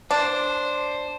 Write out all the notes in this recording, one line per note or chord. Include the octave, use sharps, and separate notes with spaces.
D4 C5